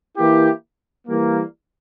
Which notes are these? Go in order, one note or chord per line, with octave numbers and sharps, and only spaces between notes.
E3 A#3 E4 G4
E3 G3 A#3